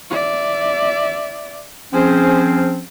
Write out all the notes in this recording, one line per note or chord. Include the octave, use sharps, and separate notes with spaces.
D5 E5
F3 C4 C#4 G#4 C5